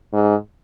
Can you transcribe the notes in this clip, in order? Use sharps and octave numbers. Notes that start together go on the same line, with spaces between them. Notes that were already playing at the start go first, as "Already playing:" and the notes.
G#2